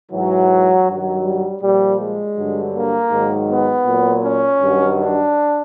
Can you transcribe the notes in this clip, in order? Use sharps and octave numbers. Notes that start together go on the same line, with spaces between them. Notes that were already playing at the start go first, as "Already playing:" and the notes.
G#2 E3 F#3
G2 D#3 F#3
G3
A#2 F3 G3
G#3
G2 D3 F#3
A#3
G#2 D#3 F#3
B3
A#2 F#3
C#4
G2 D#3 F#3
D4